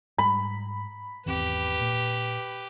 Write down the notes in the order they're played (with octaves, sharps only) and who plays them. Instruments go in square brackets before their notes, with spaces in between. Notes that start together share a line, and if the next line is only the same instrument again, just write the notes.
[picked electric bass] G#2 G3 [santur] B5
[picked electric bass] G#1 E2 C4 [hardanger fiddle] G4 B4
[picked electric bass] A#2